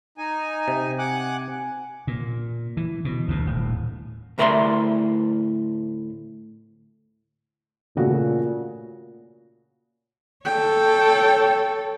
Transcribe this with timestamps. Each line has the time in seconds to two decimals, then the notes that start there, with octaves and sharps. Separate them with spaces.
0.18 D#4 G#5
0.68 C3
0.99 F#5 G#5 D6 F#6
2.07 A#2
2.77 E3
3.05 B2
3.28 D2 B2
3.46 D#1 A2
4.38 D2 A2 A#4 D5 E5 C6
7.97 A#2 C#3 A3 F#4
10.45 A4 C#5 G5